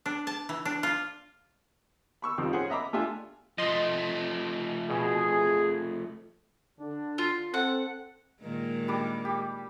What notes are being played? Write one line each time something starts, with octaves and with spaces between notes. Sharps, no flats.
D4
A5
E3
D4
F4
B5 C#6 E6
F2 C3 D#3 F3 G3
C#4 G#4 C5 F#5
D#5 E5 A#5 B5 D6
A3 D4 F4 G4 E5 G#5
F3 A3 D#5 C6
B2 G#4
D3 D4
F4
C4 A4 F#5
A#2 D#3 G#3
G3 D4 D6
G4